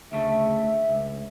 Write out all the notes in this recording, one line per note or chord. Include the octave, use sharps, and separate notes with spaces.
D2 C#3 A3 E5
C#2